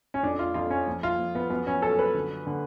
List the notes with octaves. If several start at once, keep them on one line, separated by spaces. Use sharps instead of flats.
C#4
F2 D4
F4
F2 F4
C#4
F3
F4
F3
B3
F#2 B3
C#4
F#2 A4
B4
D3
D3